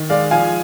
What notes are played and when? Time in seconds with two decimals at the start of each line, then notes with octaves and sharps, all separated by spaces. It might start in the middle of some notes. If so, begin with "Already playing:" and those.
Already playing: D#3
0.10 G#3 D5 F5
0.31 F3 F5 G#5